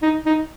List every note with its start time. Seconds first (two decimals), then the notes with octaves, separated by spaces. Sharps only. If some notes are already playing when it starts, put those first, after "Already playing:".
0.03 D#4
0.26 D#4